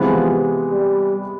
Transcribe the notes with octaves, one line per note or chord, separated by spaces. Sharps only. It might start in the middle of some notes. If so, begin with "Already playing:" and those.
Already playing: C3 E3 F3 G#3 B3
G3